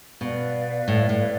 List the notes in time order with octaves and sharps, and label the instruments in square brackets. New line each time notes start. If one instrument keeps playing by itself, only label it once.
[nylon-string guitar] B2 [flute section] B4 D5 F5
[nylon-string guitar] A2
A2